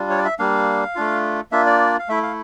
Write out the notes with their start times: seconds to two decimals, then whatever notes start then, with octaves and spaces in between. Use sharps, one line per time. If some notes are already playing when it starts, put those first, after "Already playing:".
Already playing: G3 D4 F4
0.10 C#5
0.18 D5
0.24 E5
0.39 G3 A#3 D4 F5
0.95 A3 D4 F4
1.52 A#3 D4 F4 E5
1.66 D5
1.99 F5
2.08 A3 E4 E5
2.23 F5